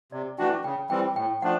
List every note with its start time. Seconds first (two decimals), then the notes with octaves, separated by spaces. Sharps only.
0.12 C3 D5
0.38 E3 A3 D4 F#4 G5
0.64 C#3 G5
0.90 E3 G3 C4 G5
1.16 A2 G5
1.42 F3 A3 D4 F#5